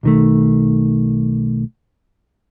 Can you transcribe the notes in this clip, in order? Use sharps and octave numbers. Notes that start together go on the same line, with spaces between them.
B1 D#3 A3